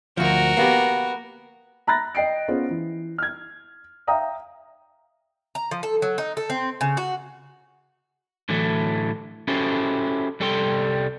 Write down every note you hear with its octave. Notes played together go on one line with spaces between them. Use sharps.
D2 F3 F#4 A#4
A#3 B3 G4
A#5 B5 F#6 A6 A#6
D#5 G5 C7 D7
B3 C#4 F4 G#4 C5
E3
F6 G#6
E5 F5 G5 A#5 D#6
A#5
F3
A4
F#3
D#4
A4
C4
C#3
F#4
A2 D3 E3 F#3 A3
C#4 E4 F#4 G4 A4 C5
C2 G3 A4 G5 A5 C6